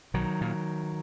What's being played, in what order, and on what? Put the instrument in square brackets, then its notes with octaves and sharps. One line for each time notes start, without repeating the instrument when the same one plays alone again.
[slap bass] B1 D#3 F#3
A#2